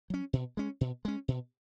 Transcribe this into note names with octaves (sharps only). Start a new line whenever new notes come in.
F#3 C#4
B2
G#3 C#4
B2
G#3 C#4
B2